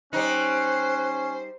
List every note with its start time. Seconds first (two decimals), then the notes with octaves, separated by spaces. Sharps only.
0.13 G3 C#4 D#4 C5 F#6